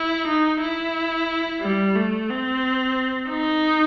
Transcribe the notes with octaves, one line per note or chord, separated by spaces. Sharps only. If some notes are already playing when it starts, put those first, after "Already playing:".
Already playing: E4
D#4
E4
G3
A3
C4
D#4